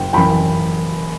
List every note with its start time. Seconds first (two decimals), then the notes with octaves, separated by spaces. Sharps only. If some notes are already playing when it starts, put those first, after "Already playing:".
Already playing: F#1 G5
0.13 F#2 E3 G5 B5